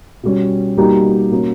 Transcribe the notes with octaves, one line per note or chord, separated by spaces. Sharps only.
B2 G3 C#4
B2 G3 A#3 D#4 G4
B2 A#3 C#4